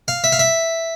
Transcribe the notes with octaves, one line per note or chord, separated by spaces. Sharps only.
F5
E5
F5
E5